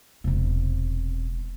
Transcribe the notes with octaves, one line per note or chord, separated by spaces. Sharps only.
E1 C3